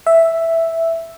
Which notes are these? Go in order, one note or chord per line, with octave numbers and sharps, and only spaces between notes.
E5